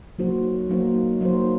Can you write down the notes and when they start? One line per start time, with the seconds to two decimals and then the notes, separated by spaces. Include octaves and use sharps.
0.19 F#3 A#3 D#4 F#4 C5
0.69 F#3 A#3 D#4 F#4 C5
1.21 F#3 A#3 D#4 F#4 C5